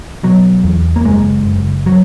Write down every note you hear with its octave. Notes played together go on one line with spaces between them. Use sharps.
B2 F#3
E2
A#3
F#1 G#3
F#1
F#3